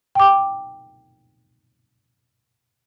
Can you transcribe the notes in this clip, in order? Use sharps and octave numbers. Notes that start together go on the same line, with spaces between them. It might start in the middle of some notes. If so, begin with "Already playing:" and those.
G5 D6